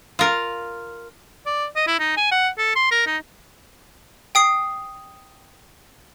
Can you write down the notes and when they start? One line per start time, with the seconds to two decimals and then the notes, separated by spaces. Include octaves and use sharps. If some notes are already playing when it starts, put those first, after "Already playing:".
0.19 F4 A#4
1.46 D5
1.76 D#5
1.87 E4
2.00 D#4
2.17 G#5
2.32 F#5
2.58 A4
2.76 C6
2.91 A#4
3.07 D#4
4.35 G5 D#6 C7